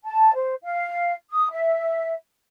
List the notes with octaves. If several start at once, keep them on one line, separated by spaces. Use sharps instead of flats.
A5
C5
F5
D#6
E5